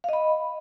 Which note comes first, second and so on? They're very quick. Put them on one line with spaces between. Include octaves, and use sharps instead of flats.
F5 D#5 B5